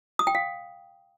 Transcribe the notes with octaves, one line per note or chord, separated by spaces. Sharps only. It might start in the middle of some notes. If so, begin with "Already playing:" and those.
D#6
G5
F5